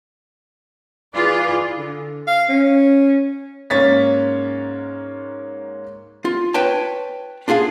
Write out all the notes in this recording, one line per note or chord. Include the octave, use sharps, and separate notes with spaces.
E3 F4 G#4 D5
D3
F5
C#4
G#2 A#3 C#4 C#5 A6 B6
F4
B4 C#5 G5 A5
D4 F4 G#4 F5 G#5